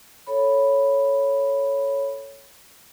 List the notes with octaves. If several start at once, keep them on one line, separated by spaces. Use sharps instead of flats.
A4 C#5 B5